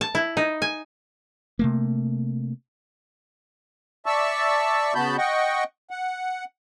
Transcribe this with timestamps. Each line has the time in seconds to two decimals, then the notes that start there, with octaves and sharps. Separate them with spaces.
0.01 A5
0.15 E4
0.37 D#4
0.62 G#5
1.59 C3 A3 A#3
4.06 D5 E5 A5 C#6 E6
4.95 C#3 B3 F#4 A5 B5 G6
5.18 D#5 F#5 G5 C#6
5.91 F#5